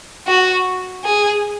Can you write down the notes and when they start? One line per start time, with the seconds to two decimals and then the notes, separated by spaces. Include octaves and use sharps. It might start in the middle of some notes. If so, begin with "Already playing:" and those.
0.27 F#4
1.05 G#4